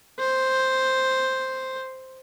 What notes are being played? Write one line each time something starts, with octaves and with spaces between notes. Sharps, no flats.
C5